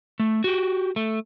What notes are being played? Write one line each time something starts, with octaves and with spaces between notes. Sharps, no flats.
A3
F#4 G4
A3